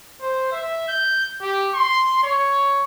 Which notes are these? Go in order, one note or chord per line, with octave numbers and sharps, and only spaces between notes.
C5
E5
G6
G4
C6
C#5